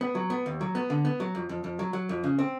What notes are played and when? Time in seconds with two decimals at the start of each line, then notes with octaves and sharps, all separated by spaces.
0.01 B3
0.15 F#3
0.30 B3
0.46 D#2
0.61 F#3
0.75 B3
0.90 D3
1.05 B3
1.20 F#3
1.35 F2
1.49 F2
1.64 F2
1.79 F#3
1.93 F#3
2.09 F2
2.24 C#3
2.39 C4